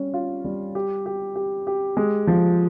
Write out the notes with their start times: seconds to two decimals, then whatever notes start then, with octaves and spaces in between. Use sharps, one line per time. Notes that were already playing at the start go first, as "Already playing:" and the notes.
Already playing: G3 C#4
0.14 F4
0.44 G3
0.75 G4
1.06 G4
1.36 G4
1.67 G4
1.97 G#3
2.27 F3